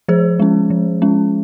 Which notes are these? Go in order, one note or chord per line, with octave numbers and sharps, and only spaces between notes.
F3 G#4 C5
G#3 C#4
F3
G#3 C#4